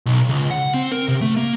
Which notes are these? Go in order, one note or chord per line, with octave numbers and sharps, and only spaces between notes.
B1
C#2
F#5
C4
A#4
C3
A3
A#3